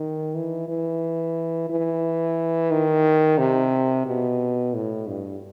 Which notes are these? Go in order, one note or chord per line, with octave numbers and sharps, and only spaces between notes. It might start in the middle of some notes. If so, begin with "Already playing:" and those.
Already playing: D#3
E3
E3
E3
D#3
C3
B2
A2
G2